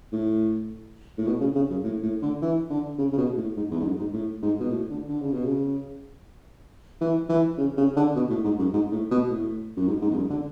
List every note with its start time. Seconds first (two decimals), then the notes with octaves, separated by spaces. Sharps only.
0.12 A2
1.18 A2
1.27 B2
1.41 C#3
1.55 C#3
1.70 F#2
1.84 A2
2.03 A2
2.22 D3
2.42 E3
2.70 D3
2.99 C#3
3.12 C#3
3.18 B2
3.37 A2
3.57 G#2
3.71 E2
3.80 G#2
3.85 F#2
3.99 G#2
4.13 A2
4.42 G#2
4.60 B2
4.71 A2
4.90 D3
5.09 D3
5.21 C#3
5.33 B2
5.45 C#3
7.01 E3
7.29 E3
7.58 C#3
7.77 C#3
7.96 D3
8.15 B2
8.30 A2
8.44 G#2
8.59 F#2
8.73 G#2
8.92 A2
9.11 B2
9.30 A2
9.77 F#2
9.88 G#2
10.02 G#2
10.11 E2
10.17 F#2
10.30 D3